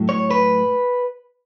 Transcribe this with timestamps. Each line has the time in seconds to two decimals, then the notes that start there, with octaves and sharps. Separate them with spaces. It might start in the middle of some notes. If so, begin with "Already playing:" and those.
Already playing: A2 F#3
0.09 C#5
0.31 B4